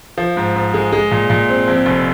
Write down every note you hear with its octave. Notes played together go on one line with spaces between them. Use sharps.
F3
G#2
G#2
G#3
G#3
A#2
A#2
C4
F2
F1